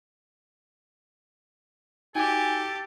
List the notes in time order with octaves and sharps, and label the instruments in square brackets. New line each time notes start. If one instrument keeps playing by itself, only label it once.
[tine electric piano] D#4 F#4 [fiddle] G4 [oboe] A4 [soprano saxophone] G#5